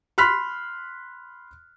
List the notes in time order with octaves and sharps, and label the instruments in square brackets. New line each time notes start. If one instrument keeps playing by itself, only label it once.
[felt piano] B5 C6 F6 F#6 B6